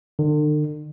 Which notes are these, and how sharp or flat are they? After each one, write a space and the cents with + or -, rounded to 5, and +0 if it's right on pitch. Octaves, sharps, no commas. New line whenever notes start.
D3 +45